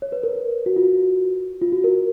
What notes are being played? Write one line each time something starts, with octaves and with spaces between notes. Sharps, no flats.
C#5
B4
A#4
F#4
F4
F4
F#4
A#4